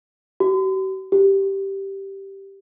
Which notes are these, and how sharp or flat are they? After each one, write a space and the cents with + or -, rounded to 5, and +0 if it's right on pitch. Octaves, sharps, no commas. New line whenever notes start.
G4 -45
G4 -5